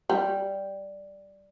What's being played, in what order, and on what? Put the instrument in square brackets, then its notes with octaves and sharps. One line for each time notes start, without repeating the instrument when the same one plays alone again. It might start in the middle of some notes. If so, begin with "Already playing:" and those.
[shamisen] G3